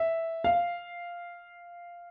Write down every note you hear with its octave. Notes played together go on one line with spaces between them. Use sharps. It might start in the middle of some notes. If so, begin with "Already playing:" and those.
Already playing: E5
F5